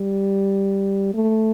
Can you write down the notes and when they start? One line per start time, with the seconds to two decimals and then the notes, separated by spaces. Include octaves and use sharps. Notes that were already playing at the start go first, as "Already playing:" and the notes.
Already playing: G3
1.14 A3